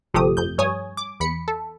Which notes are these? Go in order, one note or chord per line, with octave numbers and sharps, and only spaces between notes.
G1 C3 F3 A3 G4 D#6
F2 G6
G2 C#5 G#5 D#6
D6
E2 B5 C#7
A4